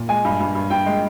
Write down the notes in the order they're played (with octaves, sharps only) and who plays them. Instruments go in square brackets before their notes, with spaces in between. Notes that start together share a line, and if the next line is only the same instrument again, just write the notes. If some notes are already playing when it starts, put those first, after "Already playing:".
Already playing: [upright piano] A#2
[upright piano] G#3 [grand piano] G#5
[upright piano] G2
G2
G2
[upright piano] G2 [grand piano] G5
[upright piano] G#3